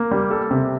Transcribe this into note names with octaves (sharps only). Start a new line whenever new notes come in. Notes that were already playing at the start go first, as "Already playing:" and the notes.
Already playing: A#3
G3
A4
C3